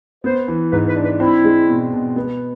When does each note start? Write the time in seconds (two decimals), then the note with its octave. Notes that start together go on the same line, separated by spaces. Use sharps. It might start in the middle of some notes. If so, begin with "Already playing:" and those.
0.24 B3 C5
0.48 E3
0.72 G#2 B4
0.88 B4
0.96 D4
1.04 B4
1.20 C4 E4
1.44 G#3
1.68 B2
1.93 B2
2.16 B3